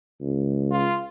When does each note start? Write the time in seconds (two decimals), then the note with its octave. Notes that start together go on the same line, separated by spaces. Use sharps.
0.21 C#2
0.71 F4